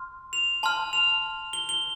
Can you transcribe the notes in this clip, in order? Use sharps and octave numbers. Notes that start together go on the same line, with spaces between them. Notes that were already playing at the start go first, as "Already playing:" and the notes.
Already playing: C6 F6
F7
A5 C6 F6
F7
G7
G7